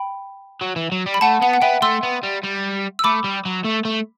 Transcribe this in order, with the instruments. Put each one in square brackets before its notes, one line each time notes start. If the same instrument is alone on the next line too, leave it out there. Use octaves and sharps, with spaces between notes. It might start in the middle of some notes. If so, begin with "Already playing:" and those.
Already playing: [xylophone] G5 B5
[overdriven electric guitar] F#3
E3
F#3
G3
[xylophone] B5
[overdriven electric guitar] A3 [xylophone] F#5 A5
[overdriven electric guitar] B3 [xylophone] F#5
[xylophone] F#5
[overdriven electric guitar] B3 [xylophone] E5 G5
[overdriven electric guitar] A3 [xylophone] C6 E6
[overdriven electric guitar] B3
G3
G3
[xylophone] E6
[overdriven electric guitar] A3 [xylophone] B5 D6
[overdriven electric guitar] G3
F#3
A3
A3